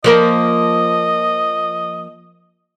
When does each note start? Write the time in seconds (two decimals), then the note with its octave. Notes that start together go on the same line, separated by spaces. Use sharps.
0.04 F3 A#3 A#4 D#5